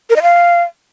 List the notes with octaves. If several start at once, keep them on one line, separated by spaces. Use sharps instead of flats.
A#4
D#5
F5